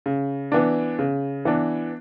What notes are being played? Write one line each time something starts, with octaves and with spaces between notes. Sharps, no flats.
C#3
E3 B3 D4
C#3
E3 B3 D4